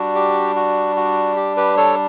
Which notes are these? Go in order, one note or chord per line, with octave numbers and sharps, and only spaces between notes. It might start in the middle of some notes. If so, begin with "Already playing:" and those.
Already playing: G3 D4 F#4
G4
F#4
F#4
G4
G4 B4
A4 C#5